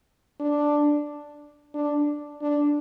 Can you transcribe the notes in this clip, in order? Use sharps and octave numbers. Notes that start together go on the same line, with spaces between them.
D4
D4
D4